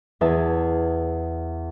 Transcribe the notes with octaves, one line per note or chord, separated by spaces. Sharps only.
E2 G#4 E5 A5